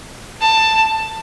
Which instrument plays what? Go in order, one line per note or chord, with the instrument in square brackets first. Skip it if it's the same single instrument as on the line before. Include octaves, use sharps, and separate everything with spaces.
[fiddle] A5